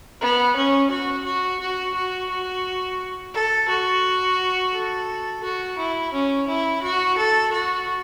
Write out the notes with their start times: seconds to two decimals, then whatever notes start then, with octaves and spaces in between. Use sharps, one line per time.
0.21 B3
0.56 C#4
0.91 F#4
1.25 F#4
1.60 F#4
1.95 F#4
2.29 F#4
3.34 A4
3.69 F#4
4.73 A4
5.43 F#4
5.78 E4
6.13 C#4
6.48 E4
6.83 F#4
7.17 A4
7.52 F#4